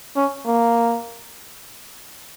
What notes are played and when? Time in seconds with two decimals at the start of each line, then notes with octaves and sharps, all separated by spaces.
0.16 C#4
0.46 A#3